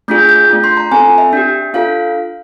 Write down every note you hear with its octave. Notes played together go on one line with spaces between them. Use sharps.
A3 D4 F4 G#4 G6
G6
A3 D4 F4
C6
A#5
C4 F4 A4 G#5
E5
D4 G4
D4 F4 A4 F5